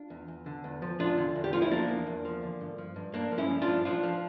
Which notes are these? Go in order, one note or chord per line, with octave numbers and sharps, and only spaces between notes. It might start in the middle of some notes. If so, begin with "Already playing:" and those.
Already playing: D4 F4
E2
E2
D3
E2
F3
E2 D4 F4
D3
E2
G4
F3 F4
E4
F3 A#3 D4
E2
E2
F3
D3
G2
F3
G2
G2 A#3 D4
F3
C#4 E4
G2
D4 F4
F3
F3 D4 F4
F3